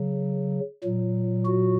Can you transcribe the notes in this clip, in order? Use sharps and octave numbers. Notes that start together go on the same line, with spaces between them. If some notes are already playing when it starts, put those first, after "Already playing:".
Already playing: C#3 F#3
A#2 F#3
F#4